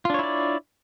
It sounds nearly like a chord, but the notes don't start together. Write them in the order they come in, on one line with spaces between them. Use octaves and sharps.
F4 D4 C#5 E4 D5